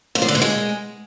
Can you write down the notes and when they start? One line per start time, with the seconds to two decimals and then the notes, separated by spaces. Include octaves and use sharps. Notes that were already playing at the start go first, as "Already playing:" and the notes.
0.15 F2
0.22 F3
0.28 D3
0.35 B2
0.42 G#3